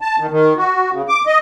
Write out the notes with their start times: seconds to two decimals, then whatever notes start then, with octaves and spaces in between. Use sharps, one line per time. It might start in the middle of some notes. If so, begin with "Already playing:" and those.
0.01 A5
0.19 D#3
0.31 D#3
0.57 F#4
0.91 C#3
1.08 D6
1.26 D#5